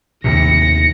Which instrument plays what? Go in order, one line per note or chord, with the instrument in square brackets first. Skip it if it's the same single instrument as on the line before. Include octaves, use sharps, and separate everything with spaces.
[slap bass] D#2 A2 C3 [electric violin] A#6 C#7